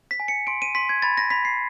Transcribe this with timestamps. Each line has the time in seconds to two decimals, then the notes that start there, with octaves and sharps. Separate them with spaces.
0.11 B6
0.20 G#5
0.28 C#7
0.47 C6 D7
0.62 D#7
0.75 C6 B6
0.89 G#6
1.02 B5 A6
1.17 A#6
1.30 B5 B6
1.45 C7